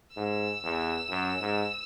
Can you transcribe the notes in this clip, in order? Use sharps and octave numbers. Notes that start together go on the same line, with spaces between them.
G#2 E6
E2
F#2
G#2